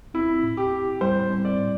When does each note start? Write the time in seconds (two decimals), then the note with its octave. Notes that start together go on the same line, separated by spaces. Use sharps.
0.14 C4 E4
0.43 A2
0.57 G4
0.73 E4
1.01 G3 C5
1.30 C4
1.45 D5
1.59 A2